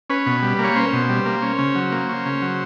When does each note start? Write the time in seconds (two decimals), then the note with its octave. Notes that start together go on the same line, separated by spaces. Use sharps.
0.10 C#4 B4
0.26 B2
0.42 G3
0.59 A#3
0.64 C#5
0.76 C#4 C5
0.93 B2
1.09 G3
1.25 A#3
1.42 C#4
1.58 C#3
1.75 F#3
1.92 A#3
2.09 C#4
2.26 C#3
2.42 F#3